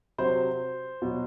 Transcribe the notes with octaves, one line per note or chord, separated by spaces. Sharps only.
C3 F#3 C5
B2 F#3